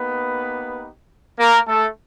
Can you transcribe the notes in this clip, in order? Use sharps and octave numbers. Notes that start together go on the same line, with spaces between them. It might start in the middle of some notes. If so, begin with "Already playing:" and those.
Already playing: A#3 B3 D#4 G4 B4
A#3 A#4
A3 A4